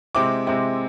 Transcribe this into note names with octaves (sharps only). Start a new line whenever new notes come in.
C3 G#3 C4 E4 D6
C3 G#3 C4 E4